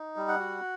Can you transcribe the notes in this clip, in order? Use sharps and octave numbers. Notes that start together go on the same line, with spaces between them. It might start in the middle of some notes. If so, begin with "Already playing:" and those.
Already playing: D#4
G3
F#5
F#4